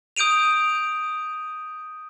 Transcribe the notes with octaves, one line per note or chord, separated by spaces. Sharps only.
D#6 G6 D7 D#7 F7